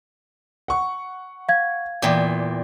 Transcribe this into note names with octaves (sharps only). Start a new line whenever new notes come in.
F#5 C#6
F5 G#6
E2 A#2 D5 G5